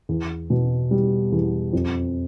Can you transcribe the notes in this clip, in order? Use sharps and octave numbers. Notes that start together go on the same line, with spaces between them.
E2
B2
G3
E2
F2